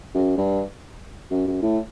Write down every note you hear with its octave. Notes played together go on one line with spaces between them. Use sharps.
F#2
G2
F#2
F#2
A2